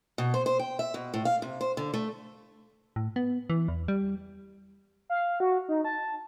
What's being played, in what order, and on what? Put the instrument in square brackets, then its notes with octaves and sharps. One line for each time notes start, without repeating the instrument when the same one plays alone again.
[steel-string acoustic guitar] B2
C5
C5
G5
E5
B2
A2
F5
C3
C5
D3
A3
[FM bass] A2
B3
E3
E2
G3
[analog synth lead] F5
F#4
D#4
A5